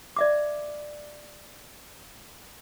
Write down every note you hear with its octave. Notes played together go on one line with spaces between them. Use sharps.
D5 E5 D6